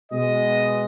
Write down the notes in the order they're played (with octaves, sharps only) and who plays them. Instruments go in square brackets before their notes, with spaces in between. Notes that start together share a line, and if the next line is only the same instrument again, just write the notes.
[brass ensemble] B2 G#3 B3 D#5